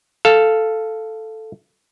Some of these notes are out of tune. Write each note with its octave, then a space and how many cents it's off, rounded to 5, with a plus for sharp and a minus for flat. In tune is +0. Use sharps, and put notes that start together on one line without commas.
A4 +0 F5 -5